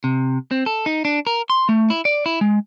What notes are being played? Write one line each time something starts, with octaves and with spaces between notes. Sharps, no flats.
C3
C4
A4
D#4
D4
A#4
C6
A3
E4
D5
E4
G#3